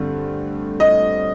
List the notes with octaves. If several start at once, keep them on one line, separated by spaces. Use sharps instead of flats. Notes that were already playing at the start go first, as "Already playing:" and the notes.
Already playing: G2 D3 A3 C4
D#5